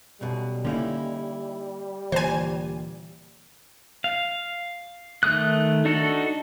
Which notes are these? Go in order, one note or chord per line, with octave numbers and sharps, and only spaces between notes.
B1 F#2 B2 G3
D3 A#3 C#4 D#4 E4
D2 A#2 E3 C5 G#5
F5
D#3 A3 D#6 F#6
D4 D#4 F#4 A4